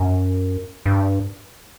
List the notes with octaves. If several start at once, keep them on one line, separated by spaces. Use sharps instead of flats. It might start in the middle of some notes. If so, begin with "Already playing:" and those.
Already playing: F#2
G2